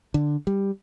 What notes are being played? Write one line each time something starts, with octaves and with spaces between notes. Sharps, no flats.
D3
G3